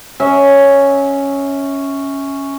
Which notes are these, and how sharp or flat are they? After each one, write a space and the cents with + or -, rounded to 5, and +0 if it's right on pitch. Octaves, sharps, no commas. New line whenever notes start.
C#4 +0 E5 -25